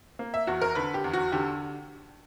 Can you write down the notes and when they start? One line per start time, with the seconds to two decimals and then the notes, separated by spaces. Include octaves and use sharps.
0.19 A#3
0.34 E5
0.47 E2 F#4
0.62 A#4
0.75 D3 B4
0.94 G4
1.04 E2
1.13 F#4
1.32 D3 G4